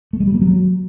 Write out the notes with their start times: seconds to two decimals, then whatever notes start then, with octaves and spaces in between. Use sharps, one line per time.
0.13 A3
0.20 G#3
0.27 G3
0.34 A#3
0.41 F#3